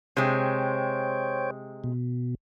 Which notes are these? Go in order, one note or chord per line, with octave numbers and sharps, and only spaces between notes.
C3 G#3 C5 C#5 G5
B2